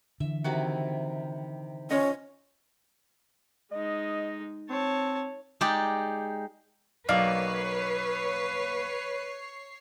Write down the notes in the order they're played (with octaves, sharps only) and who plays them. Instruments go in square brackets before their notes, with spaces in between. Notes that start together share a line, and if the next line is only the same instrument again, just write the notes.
[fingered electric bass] D3 E3 [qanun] E5
[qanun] C3 D#3 E4 [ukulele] F#4
[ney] C#4 [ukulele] F4 C#5 D#5
[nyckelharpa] G#3 D#4 [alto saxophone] D#5
[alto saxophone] C4 [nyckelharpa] C#5 A5
[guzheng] G#3 D#4 G4 D5
[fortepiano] B1 D5 [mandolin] A#3 [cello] B4 [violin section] C#5 C7